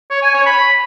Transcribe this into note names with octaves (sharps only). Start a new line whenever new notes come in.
C#5
G#5
C#5
B5